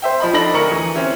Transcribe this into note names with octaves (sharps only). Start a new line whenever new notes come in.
C5 E5 G5
F3 D#5 B5
D4 D#4 A4 B5 A#6 F#7
D2 A#4 C#6 C#7 F#7
E3
C4 C#4 E4